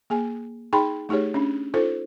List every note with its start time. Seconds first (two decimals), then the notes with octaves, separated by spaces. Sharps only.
0.10 A#3 G#4 G#5
0.73 D#4 G#4 G5 B5 C6
1.09 A3 D#4 G4 G#4 C#5
1.34 C#4 D4
1.74 D#4 F4 A4 C5